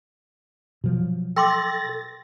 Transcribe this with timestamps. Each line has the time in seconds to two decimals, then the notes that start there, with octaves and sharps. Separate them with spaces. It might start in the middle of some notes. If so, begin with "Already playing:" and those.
0.84 B2 F3 F#3
1.36 A4 G5 C6 D6 A6 A#6